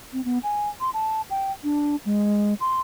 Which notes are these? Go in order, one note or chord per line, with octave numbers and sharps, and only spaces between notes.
C4
B3
G#5
C6
A5
G5
D4
G#3
C6